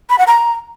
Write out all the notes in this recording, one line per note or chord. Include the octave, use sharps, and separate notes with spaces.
B5
F#5
A#5